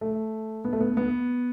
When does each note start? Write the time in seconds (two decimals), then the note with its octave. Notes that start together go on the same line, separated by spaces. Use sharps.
0.01 A3
0.65 B3
0.73 A3
0.80 B3
0.97 B3